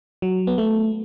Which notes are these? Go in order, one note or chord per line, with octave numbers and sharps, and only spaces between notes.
F#3
B3
A3